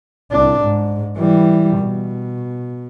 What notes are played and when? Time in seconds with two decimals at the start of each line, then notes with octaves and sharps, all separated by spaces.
0.32 C2 D4
0.62 G#2
1.17 E3 G3
1.79 B2